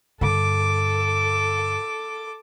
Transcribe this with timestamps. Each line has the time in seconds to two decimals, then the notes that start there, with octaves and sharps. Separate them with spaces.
0.21 G2 D3 A4 D6